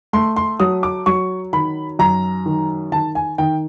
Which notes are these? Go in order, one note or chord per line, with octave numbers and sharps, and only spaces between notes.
A3 C6
C6
F#3 D#6
D6
F#3 C#6
D#3 B5
F#2 A#5
D#3
D#3 A5
G#5
D#3 G5